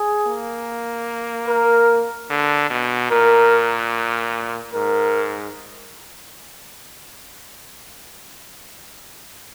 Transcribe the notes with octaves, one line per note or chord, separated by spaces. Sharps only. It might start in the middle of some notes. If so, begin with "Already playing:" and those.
Already playing: G#4
A#3
A#4
D3
B2
A#2 A#4
G#2 A#4